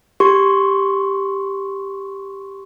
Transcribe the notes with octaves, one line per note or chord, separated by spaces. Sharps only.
G4 C6 C#6